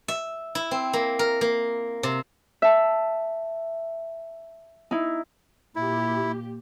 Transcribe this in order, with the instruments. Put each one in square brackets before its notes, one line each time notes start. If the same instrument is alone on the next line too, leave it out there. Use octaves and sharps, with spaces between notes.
[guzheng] E5
E4
C4
A#3
A#4
A#3
C3
[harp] E5 A5
D#4 E4
[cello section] A#2 G4 [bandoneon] E4